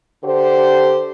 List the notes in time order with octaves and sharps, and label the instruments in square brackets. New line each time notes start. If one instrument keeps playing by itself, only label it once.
[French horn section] D3 G4 A4 C5